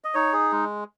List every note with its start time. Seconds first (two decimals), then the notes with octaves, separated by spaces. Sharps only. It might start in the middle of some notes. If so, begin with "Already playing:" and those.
0.04 D#5
0.14 D#4 C#5
0.33 G#4
0.52 G#3